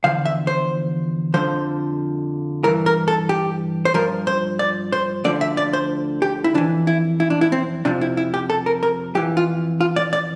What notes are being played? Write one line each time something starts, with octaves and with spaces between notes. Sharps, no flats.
E2 D3 F3 F5
E5
C5
F2 D3 F3 C5
G2 E3 A#4
A#4
A4
G4
C5
G2 F3 A#4
C5
D5
C5
D2 D3 F3 D5
E5
D5
C5
G4
E4
F2 E3 D4
E4
E4
D4
E4
C4
F2 C3 F3 D4
E4
E4
G4
A4
A#4
A#4
F2 E3 G4
F4
F4
D5
D5